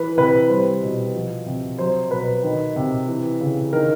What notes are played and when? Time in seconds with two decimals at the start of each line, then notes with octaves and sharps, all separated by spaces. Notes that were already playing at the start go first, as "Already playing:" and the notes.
Already playing: E3 B4
0.17 C3 B4
0.49 G3 C5
0.83 B2
1.14 F3
1.46 C3
1.78 F#3 C5
2.11 B2 B4
2.43 D#3
2.76 C3
3.08 E3
3.41 C#3
3.73 D#3 A#4